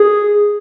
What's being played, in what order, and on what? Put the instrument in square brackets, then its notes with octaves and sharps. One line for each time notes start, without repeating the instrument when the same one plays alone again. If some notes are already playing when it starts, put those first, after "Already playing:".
Already playing: [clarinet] G#4